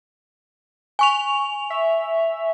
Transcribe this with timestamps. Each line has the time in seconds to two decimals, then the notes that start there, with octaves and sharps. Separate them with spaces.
0.99 G#5 C#6 F7
1.70 E5